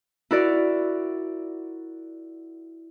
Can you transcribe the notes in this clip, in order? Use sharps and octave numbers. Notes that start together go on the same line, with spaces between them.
E4 F#4 A#4 D5